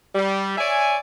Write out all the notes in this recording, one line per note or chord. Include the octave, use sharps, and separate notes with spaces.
G3
C#5 D5 E5 G#5